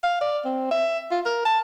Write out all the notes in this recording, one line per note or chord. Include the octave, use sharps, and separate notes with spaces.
F5
D5
C4
E5
F4
A#4
A5